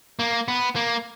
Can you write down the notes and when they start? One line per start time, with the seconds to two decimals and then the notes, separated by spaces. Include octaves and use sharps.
0.19 A#3
0.48 B3
0.76 A#3